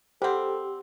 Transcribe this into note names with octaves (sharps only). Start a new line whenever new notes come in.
G3 C4 G4 A4 C5 F#5